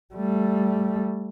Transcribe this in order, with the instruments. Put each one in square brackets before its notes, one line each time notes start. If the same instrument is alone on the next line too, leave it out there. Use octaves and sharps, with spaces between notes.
[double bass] G3 A3